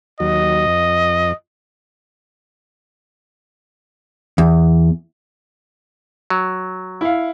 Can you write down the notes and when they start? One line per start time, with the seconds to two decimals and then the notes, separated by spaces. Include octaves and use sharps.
0.20 D#2 F#3 D#5
0.66 F2
4.38 E2
6.30 F#3
7.01 E4 F5